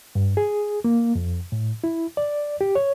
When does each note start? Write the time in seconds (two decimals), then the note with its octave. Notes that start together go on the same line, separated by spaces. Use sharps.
0.15 G2
0.37 G#4
0.85 A#3
1.15 F2
1.52 A2
1.84 E4
2.17 D5
2.61 G4
2.75 C#5